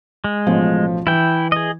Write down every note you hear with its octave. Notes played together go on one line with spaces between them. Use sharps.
G#3
A1 B2 F3
E3 E4 G5
G#4 D#5